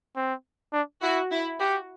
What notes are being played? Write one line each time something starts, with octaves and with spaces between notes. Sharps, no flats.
C4
D4
E4 F#4
E4
F#4 G4